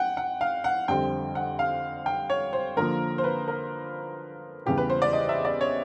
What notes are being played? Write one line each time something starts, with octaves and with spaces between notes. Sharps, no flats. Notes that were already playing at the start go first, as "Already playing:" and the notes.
Already playing: F#5 G5
F#5
F5
F#5
F2 D3 G3 C4 G5
F#5
F5
G5
C#5
C5
D3 F3 A#3 A#4
C5
B4
A#4
E2 C#3 E3 G3 G4
B4
C5
D5
D#5
E5
D5
C#5